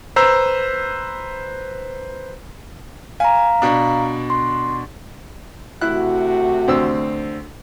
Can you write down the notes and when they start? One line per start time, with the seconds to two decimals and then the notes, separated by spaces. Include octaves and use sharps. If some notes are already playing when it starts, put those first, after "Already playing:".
0.16 B4 C5 A#5 E6
3.20 F5 G#5 A#5
3.62 B2 D4
4.30 C6
5.81 C3 A3 E4 F#4 F#6
6.68 D2 C4 E6